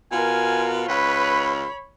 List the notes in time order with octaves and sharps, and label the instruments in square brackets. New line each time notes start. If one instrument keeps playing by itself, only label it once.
[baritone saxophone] B2 [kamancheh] F4 A#4 [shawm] G#5
[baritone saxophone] C#2 [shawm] B4 [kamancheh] C#5 B5